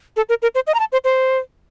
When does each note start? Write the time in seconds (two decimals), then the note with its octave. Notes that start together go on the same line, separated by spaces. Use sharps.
0.17 A4
0.29 A#4
0.42 A#4
0.55 C5
0.67 D#5
0.74 A#5
0.80 A5
0.92 C5
1.04 C5